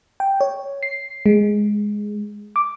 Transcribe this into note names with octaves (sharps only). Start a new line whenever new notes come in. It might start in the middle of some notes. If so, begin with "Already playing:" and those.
G5
C#5
C7
G#3
D6